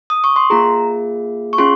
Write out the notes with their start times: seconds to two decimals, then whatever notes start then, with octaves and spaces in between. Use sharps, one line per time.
0.10 D#6
0.24 C#6
0.36 C6
0.50 A#3 F4 G#4 A#5
1.53 C#6
1.58 C#4 F4 G#4 C6